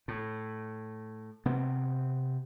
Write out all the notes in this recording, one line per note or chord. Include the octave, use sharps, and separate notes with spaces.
A2
C3 B3 C4